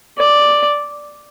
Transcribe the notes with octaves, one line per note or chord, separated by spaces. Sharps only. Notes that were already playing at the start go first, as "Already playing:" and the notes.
D5